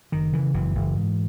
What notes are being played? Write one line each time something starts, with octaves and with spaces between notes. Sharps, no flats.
F#1 D#3
C#3 E3
F#1 E3
F#1
G#2